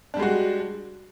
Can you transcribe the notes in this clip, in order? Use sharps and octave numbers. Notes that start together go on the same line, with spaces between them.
G3 G#3 D4 F#4